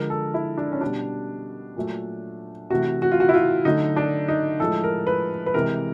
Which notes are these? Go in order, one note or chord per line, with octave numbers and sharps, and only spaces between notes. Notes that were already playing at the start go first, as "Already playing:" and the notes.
Already playing: D3 F3 G#3 A#4
A4
E4
D4
C#4
B2 G3 D4
A#2 F#3 A3
C3 E3 A3 F#4
F#4
F4
F#4
E4
F4
D3 F#3 A3 D#4
D4
D#4
A2 F3 G#3 A4
A#4
B4
B4
C3 E3 G#3 A#4